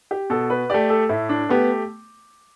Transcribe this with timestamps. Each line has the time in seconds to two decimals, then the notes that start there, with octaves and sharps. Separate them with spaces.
0.11 G4
0.30 B2 A4
0.50 B4
0.70 A3 G4 D5
0.90 A4
1.09 A2 E4
1.29 D4
1.49 A3 B3 G4